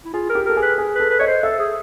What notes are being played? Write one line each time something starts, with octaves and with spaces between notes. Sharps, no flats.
E4
F4 G#4
A#4
G4
A4 A#4
G#4
B4
G#4
B4
A4
B4
C#5 D#5
C5
A4 E5
G#4